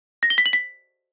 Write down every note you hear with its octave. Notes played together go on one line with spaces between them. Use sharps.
A#6
G7
B6
F#7
B6